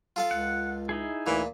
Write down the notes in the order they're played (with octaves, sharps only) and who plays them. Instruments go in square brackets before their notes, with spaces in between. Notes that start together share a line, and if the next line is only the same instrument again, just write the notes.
[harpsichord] F4 A4 F5
[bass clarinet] C#2 [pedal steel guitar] F#5
[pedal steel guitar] D#4 E4 G#4
[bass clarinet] D2 [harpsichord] A#2 [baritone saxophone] E3